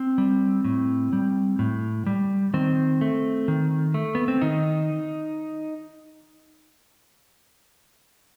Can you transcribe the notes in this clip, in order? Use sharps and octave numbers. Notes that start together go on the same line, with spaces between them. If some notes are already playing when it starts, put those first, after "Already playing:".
Already playing: C4
G3
A2
G3
A2
G3
D#3 C4
A3
D#3
A3
B3
C4
D#3 D#4